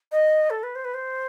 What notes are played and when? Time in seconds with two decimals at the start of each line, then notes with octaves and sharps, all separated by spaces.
0.12 D#5
0.50 A4
0.63 B4
0.75 C5
0.84 B4
0.94 C5